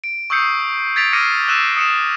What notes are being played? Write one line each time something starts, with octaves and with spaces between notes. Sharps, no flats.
D7
C#6 D#6 E6 G6 C7 C#7
G#6 A6 B6 D7 F7
D6 F6 A#6 C7 C#7 D#7
E6 F#6 D#7 E7
D#6 C#7 E7